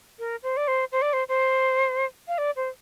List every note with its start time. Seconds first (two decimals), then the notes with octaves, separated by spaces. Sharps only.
0.19 A#4
0.43 C5
0.57 D5
0.68 C5
0.92 C5
1.02 D5
1.13 C5
1.29 C5
2.28 F5
2.38 D5
2.56 C5